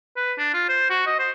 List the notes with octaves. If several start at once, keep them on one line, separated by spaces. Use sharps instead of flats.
B4
D4
F4
C5
F#4
D#5
C5